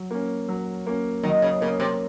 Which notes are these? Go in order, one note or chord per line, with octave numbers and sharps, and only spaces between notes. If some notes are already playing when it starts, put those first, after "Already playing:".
Already playing: F#3
A#3 C#4
F#3
A#3 C#4
D#3 F#3
C#3
C#3 A#3 C#4
C3